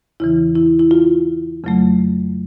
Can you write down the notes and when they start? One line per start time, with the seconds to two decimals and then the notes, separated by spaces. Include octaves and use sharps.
0.20 E2 C#3 E3 E4
0.56 E4
0.80 E4
0.91 F4
1.64 F2 C#3 F#3 A3